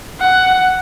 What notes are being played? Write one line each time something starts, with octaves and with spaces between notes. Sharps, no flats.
F#5